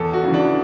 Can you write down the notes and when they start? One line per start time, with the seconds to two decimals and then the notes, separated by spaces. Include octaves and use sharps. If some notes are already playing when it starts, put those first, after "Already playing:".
Already playing: E2 A4
0.13 F#4
0.23 C#3 E3
0.34 D4